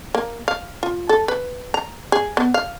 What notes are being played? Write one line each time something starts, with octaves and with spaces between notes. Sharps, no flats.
A#3
F5
F4
A4
B4
A#5
G#4
B3
F5